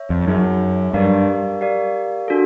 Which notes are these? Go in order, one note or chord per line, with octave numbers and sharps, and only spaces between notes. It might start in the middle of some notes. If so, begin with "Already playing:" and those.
Already playing: C#5 E5
F2
F#2 D#4 G#4 C#5 E5
G2 G4 A#4 D5 F5
G4 A#4 D5 F5
D4 F#4 A4